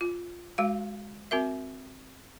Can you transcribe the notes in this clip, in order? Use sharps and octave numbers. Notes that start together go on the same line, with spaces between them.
F4
G#3 F#4 F5
C4 F#4 A#4 E5